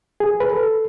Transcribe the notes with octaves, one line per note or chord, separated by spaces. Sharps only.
G#4
B4
A4